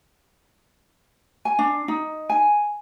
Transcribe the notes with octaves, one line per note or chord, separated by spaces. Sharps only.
G#5
D4
D#4
G#5